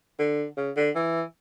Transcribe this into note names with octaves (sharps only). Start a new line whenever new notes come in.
D3
C#3
D3
E3